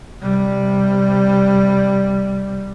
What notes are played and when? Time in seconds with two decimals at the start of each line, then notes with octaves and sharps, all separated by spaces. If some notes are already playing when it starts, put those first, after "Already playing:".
0.20 C3 G3